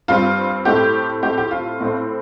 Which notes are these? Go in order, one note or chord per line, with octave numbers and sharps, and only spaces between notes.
G2 G3 C4 F4
A2 A3 C4 G4
A2 A3 C4 G4
G4
F4
A2 A3 C4